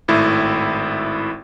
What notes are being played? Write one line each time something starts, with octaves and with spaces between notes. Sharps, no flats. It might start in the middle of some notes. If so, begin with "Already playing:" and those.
G#1 A2 E4